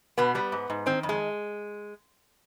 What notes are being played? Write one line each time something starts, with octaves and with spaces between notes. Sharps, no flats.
B2 B3
G3 B3
G#2
G#2
D#3 C4
F2
G#3